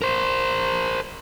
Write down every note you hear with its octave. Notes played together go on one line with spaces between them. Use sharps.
A#4 C5